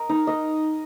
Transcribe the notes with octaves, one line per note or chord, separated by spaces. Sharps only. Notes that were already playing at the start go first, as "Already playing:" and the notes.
Already playing: A#4 D#5
D#4
D#5